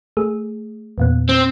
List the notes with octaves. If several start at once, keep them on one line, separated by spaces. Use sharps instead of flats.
A3 G#4
E2 A#2 B3
C4